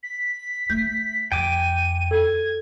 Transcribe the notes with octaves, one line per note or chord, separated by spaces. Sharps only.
B6
A3 G6
F2 G5 G#5 D6 D#7
A4 G#6